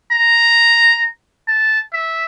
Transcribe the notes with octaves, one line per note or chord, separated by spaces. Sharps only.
A#5
A5
E5